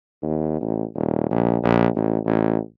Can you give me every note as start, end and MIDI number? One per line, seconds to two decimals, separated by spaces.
0.22 0.58 39
0.61 0.85 33
0.95 1.27 27
1.31 1.57 34
1.63 1.87 34
1.96 2.18 33
2.26 2.58 33